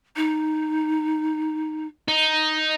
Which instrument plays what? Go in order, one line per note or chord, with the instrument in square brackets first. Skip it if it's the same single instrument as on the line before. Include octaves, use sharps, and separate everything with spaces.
[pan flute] D#4
[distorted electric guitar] D#4